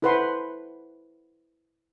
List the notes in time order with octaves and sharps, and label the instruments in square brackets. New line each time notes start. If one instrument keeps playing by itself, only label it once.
[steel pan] E4 A4 B4 C5 F#5 C6